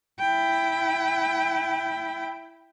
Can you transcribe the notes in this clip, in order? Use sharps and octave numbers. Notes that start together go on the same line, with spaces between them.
E4 G5